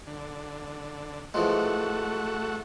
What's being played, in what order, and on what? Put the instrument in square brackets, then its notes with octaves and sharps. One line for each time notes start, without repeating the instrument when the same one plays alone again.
[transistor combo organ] D3
[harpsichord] E3 F3 G#3 [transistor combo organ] A3 F#4